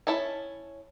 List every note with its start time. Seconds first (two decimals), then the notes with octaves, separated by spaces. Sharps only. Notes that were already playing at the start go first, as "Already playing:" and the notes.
0.07 C#4 E4 C#5 A5